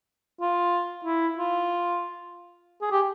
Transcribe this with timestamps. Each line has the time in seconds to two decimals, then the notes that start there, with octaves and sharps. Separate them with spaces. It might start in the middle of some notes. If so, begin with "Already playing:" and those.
0.41 F4
1.05 E4
1.38 F4
2.81 G#4
2.91 G4